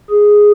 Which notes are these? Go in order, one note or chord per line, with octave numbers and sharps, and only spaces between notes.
G#4